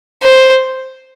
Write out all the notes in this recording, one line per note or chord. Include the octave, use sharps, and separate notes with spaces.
C5